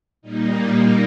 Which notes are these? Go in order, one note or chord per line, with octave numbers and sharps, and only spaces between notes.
A#2 G3 A#3 D#4